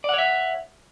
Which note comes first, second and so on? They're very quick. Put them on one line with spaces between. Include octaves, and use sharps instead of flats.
D5 F#5 C#5 E5